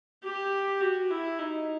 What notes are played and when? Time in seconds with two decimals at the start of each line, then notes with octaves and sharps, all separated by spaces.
0.24 G4
0.81 F#4
1.10 E4
1.39 D#4